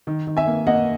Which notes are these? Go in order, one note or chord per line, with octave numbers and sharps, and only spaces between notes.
D#3
D#3
E5 G#5
A#3
A#3 D#5 F#5